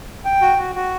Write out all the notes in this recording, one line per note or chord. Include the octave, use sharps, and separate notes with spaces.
G5
F#4
F#4
F#4